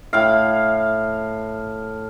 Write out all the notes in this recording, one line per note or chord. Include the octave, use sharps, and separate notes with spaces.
A2 F5